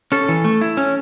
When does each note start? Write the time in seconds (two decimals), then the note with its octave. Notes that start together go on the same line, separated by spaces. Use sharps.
0.12 C#4 A4
0.29 E3
0.44 A3
0.61 E4
0.77 C#4